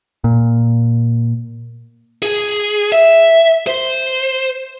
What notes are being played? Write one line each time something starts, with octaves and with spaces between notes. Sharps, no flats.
A#2
G#4
E5
C5